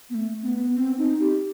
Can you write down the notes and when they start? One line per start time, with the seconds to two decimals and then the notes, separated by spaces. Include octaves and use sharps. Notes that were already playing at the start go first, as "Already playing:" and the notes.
0.10 B3
0.15 A3
0.42 C4
0.46 B3
0.76 C4
0.98 D#4
1.20 G4